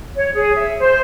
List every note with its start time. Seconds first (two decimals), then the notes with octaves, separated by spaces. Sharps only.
0.16 C#5
0.35 G#4
0.56 E5
0.79 C5